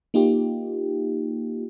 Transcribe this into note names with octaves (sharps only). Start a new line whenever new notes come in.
A#3 D#4 F4 G4